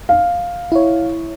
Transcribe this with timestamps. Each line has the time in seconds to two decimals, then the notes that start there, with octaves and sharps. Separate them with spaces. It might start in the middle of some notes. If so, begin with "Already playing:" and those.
0.09 F5
0.72 E4 C#5